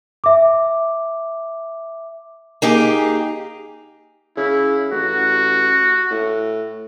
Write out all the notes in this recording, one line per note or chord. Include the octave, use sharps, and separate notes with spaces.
E5 D6
A#3 D#4 G4 G#4
C#3 E4
A1 F#4
A2